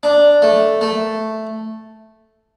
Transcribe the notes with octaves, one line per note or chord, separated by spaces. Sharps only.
D4
A3
A3